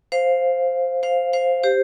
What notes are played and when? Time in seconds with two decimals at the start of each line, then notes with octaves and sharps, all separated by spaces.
0.12 C5 F5
1.03 C5 F5
1.33 C5 F5
1.63 G4 C5